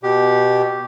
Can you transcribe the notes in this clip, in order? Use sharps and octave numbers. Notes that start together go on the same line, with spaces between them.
B2 G4